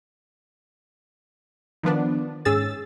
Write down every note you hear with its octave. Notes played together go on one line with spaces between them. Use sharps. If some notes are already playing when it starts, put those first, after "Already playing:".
D#3 F3 B3 D4
G#2 C#4 G#4 E6 A6